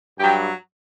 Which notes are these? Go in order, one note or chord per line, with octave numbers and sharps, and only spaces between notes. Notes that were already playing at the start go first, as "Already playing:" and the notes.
G2 F#3 G4 G5